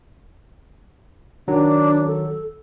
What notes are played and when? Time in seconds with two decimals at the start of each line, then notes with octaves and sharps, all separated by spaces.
1.48 D#3 F#3 D4
2.07 A4